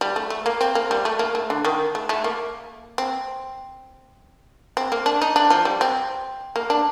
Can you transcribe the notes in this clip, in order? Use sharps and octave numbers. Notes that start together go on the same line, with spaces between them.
G3
A3
A3
A#3
C4
A#3
G3
A3
A#3
A3
D3
D#3
A3
A3
A#3
C4
C4
A#3
D4
D#4
D4
F3
G3
C4
A#3
D4